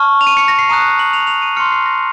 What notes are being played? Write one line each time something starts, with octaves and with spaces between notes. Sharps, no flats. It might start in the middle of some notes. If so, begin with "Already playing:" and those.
Already playing: A5 C#6 F6
F7
D#7
C#7
A#6
C7
A#5 D#6 F#6 D#7
F#7
F7
F7
D#7
C6 F6 C#7
C7
A#6